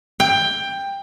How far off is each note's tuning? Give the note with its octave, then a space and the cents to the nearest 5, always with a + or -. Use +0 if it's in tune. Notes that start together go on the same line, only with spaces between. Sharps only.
G5 +15